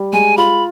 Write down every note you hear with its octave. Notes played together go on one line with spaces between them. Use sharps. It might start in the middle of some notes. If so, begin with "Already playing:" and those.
Already playing: G3
G#3 G#5
F4 B5